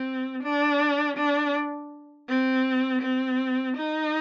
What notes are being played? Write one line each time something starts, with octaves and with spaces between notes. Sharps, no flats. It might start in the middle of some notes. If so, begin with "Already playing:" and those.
Already playing: C4
D4
D4
C4
C4
D#4